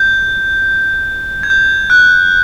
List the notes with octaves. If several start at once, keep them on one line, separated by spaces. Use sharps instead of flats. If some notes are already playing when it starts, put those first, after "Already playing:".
Already playing: G6
G#6
G6
F#6